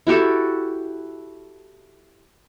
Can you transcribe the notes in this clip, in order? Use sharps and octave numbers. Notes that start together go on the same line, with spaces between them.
E4 F#4 G4 A4